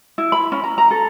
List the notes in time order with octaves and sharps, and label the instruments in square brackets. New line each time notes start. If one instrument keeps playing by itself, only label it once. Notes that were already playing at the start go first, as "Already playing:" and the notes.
[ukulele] E4
B5
C#4
A#5
A#5
A4